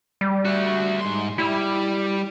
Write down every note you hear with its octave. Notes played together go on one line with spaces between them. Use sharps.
G3
A3 F#4
G#2 C6
G3 E4